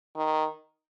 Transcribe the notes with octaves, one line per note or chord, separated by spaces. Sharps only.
D#3